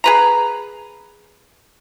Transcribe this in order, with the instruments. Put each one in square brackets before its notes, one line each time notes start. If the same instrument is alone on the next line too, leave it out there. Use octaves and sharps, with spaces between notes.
[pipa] G#4 B4 A#5